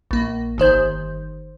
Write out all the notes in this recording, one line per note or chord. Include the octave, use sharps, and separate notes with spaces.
A#1 A#3
G1 D#3 C5 G6